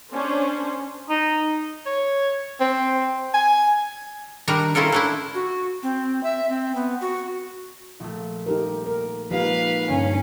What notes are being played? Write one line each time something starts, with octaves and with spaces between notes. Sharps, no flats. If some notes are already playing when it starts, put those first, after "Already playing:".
C#4 D4 C5
D#4
C#5
C4
G#5
D#3 G3 D4 A#4 A#5
C#4 E4 F4 A4 A#4
A3 D4 E4
F#4
C4
E5
C4
B3
F#4
A#1 A3
D#4 G4 A#4
A#4
F3 G#3 A#3 D#4 G4 B4 F5
G2 D3 C#4